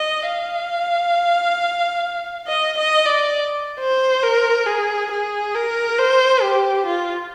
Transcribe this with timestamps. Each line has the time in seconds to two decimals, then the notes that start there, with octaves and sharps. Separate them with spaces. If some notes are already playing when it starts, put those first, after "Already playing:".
Already playing: D#5
0.28 F5
2.47 D#5
2.78 D#5
3.06 D5
3.80 C5
4.23 A#4
4.66 G#4
5.11 G#4
5.55 A#4
5.98 C5
6.43 G4
6.86 F4